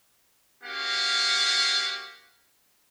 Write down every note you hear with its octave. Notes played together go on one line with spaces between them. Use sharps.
A#3 C#4 F#4 G4 F5 F#5